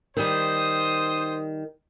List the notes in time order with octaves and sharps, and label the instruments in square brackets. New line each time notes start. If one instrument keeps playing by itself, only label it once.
[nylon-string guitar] D#3 G3 [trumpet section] C5 D#6